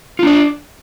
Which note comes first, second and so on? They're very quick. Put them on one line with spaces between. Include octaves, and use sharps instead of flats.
F4 D4 D5